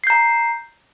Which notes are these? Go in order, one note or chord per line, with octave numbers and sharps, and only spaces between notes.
A#5 G6 C7